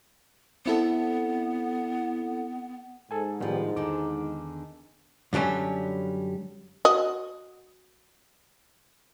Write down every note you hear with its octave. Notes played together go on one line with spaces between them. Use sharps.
B3 C4 E4 A4
G#2 A4 G#5
A2 D#3 F3 G3 B3
E2 D3 D#3 D6
F#2 D3 F#3 G3 C#4
F#4 D#5